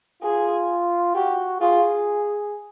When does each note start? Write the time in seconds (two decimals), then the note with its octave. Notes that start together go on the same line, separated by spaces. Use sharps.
0.23 F4 G#4
1.15 F#4 G4
1.61 F4 G#4